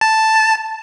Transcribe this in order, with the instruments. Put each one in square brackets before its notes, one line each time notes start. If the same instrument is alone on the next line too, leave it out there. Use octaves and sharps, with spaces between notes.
[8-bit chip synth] A5